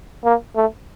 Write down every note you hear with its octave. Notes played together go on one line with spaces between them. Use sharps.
A#3
A3